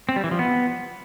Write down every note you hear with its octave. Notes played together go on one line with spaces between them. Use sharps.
C4
G3
E3
F3
B3